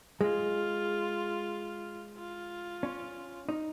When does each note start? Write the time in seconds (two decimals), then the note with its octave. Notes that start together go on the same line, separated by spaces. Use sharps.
0.21 G#3 F4
2.18 F4
2.83 C#4
3.49 D#4